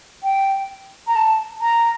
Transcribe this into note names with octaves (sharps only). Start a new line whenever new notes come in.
G5
A#5
A5
A#5